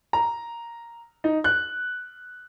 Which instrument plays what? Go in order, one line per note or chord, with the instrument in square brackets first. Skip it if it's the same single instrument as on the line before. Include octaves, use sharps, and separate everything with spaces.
[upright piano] A#5
D#4
F#6